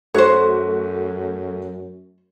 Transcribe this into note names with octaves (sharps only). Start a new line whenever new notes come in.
F#2 A3 F#4 C5 C#5